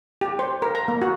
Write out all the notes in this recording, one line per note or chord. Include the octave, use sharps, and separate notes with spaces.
G4
C5
A#4
A#5
A#3
F#4